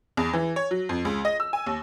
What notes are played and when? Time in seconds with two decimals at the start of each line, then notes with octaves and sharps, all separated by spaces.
0.17 E2
0.33 E3
0.56 C#5
0.71 F#3
0.89 F2
1.05 C#2
1.25 D#5
1.40 E6
1.53 G#5
1.67 D#2